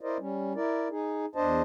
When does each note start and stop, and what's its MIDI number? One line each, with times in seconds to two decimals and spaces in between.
0.01 0.17 64
0.01 0.17 70
0.01 0.17 72
0.01 0.17 74
0.01 0.17 75
0.19 0.53 55
0.19 0.53 61
0.55 0.88 64
0.55 0.88 70
0.55 0.88 74
0.90 1.26 63
0.90 1.26 68
1.35 1.62 40
1.35 1.62 62
1.35 1.62 72
1.35 1.62 75
1.35 1.62 81